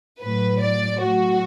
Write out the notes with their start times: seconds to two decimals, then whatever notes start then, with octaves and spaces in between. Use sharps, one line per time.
0.21 A2 F#3 B4
0.62 D5
1.01 A2 F#3 F#4